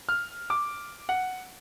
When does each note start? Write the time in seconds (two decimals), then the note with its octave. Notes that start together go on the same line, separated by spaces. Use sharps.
0.09 F6
0.50 D6
1.09 F#5